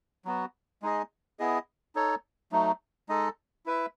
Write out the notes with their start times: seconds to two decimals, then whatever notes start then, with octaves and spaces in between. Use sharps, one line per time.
0.25 F#3 B3 F#4
0.82 G#3 D#4 G#4 D#5
1.39 B3 E4 G#4 D#5
1.95 D#4 A4 C#5
2.52 F#3 A3 D#4
3.09 G#3 D#4 A4 D#5
3.66 E4 B4 E5